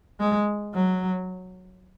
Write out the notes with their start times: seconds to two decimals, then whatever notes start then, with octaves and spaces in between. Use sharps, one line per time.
0.19 G#3
0.74 F#3